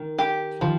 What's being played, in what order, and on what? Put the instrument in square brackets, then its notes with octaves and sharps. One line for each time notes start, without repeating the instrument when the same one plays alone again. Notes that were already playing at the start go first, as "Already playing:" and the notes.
Already playing: [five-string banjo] D#3
G4
[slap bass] D#3 [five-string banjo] F3